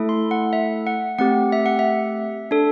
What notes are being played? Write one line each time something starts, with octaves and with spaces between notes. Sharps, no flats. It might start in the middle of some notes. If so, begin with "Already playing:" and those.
Already playing: A3 E4 A4
C6
F#5
E5
F#5
A3 C4 G4 F#5
E5
F#5
E5
D4 A4